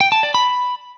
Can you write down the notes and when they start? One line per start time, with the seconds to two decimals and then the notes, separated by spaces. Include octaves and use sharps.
0.01 G5
0.12 A5
0.23 D5
0.34 B5